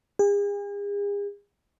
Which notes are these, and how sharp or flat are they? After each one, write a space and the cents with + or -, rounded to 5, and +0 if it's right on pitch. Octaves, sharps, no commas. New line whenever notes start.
G#4 -40